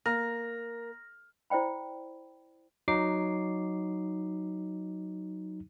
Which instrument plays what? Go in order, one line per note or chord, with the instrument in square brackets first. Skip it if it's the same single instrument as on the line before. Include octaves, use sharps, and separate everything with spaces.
[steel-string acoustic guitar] A#3 [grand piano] A#5 F6 [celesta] A#6
[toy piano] E4 C5 D5 G5 B5
[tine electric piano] F#3 D#4 D6 C7